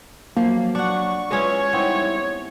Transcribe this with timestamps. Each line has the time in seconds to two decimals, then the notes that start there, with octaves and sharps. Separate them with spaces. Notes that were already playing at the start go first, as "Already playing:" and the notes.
0.37 F3 F#3 A#3
0.75 D4 F#5 C#6
1.31 G#3 C#4 E4 F4 B4 C#5
1.73 G3 B3 C4 D#4 E4